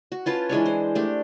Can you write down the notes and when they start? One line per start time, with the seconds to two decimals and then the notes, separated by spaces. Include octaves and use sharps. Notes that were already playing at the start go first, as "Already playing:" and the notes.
0.12 F#4
0.26 C#4 F4 B4 A5
0.49 E3 G#3 D4 C#5
0.66 C5
0.95 A3 D4 G4